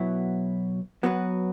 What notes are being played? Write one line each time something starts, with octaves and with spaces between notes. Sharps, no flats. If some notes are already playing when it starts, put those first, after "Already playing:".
Already playing: B2 F#3 B3 E4
F#3 B3 F#4 B4